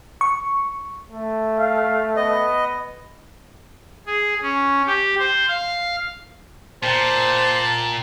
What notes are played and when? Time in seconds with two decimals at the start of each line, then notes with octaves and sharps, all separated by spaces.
0.21 C#6
1.11 A3
1.59 F5
2.16 B3 D#5
4.07 G#4
4.42 C#4
4.87 G4
5.19 C5
5.48 F5
6.83 A#2 C5 G5 A5 A#5